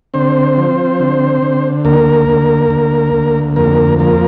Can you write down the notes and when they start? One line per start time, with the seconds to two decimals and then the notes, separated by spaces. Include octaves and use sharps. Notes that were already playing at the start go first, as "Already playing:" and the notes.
0.14 D3 C4 C5
0.57 F3
1.00 D3
1.42 D3
1.85 D2 A#3 A#4
2.29 D2
2.70 D2
3.14 D2
3.56 F2 A#3 A#4
3.99 F3 A#3 A#4